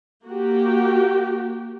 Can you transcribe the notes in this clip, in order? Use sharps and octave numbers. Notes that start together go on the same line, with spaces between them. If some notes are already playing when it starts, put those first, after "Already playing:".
A#3 F#4 G4